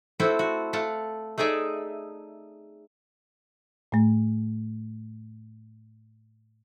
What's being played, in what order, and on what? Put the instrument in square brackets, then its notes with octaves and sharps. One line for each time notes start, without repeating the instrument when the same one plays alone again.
[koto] A3 C4 E4 F#4 A4
F#4
A3 A4 F5 F#5 A5
A3 D#4 G#4 D5 E5
[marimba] A2 A3